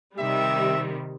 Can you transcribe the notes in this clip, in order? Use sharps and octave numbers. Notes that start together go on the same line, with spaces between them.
C3 D#3 G3 G4 E5